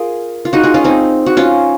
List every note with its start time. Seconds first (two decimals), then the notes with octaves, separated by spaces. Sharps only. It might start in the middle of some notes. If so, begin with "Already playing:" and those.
Already playing: F4 G#4 A#4
0.45 F4
0.53 D#4 F#4
0.63 F4 G#4
0.74 C#4 F4
0.84 C4 D#4
1.26 F#4
1.37 C#4 F4